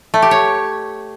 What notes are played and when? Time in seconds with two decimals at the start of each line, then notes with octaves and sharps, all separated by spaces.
0.14 A3
0.22 G4
0.31 C#5